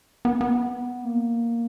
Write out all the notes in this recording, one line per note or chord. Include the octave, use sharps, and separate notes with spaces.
B3
B3
A#3